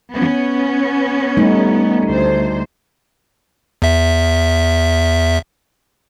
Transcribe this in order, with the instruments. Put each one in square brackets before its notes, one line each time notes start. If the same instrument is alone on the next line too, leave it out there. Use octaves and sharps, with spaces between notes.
[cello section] B3 C#4
[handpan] G3 A3 D#4
[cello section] D2 C5
[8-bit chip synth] E2 E5